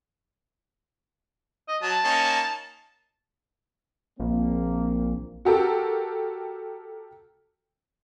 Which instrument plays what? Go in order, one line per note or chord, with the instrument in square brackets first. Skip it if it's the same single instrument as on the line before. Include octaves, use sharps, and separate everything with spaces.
[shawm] D#5
[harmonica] F#3 [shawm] A5
[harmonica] A#3 C#4 D#4
[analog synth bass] A#1 [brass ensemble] A#3 C4
[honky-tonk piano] F#4 G4 A4 A#4